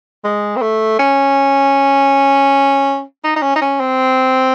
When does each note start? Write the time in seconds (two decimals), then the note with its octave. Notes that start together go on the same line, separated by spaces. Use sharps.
0.24 G#3
0.56 C4
0.62 A3
0.99 C#4
3.24 D#4
3.36 D#4
3.42 C#4
3.56 D#4
3.61 C#4
3.80 C4